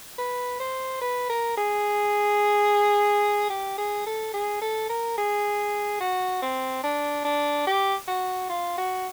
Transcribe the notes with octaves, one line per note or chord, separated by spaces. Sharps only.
B4
C5
B4
A#4
G#4
G4
G#4
A4
G#4
A4
A#4
G#4
F#4
C4
D4
D4
G4
F#4
F4
F#4